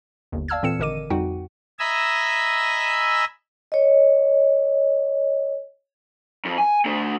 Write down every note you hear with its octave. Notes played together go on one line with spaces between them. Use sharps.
G1 D#2
D5 F5 A5 E6 F6 G#6
A#2 E3 C4 A4 C#7 E7
G#1 D3 A#4 D#5 D6 D#7
F2 G3 D#4 F#4 F#5 G5
D#5 E5 G#5 A#5 B5 E6
C#5 D#5
F2
G#5
A3 D4